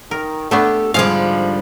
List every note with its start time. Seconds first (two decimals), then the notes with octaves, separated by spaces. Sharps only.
0.11 D#3 A#4
0.51 A3 B3 D4 G4 A4
0.94 G#2 D3 F3 G3 G#3 F5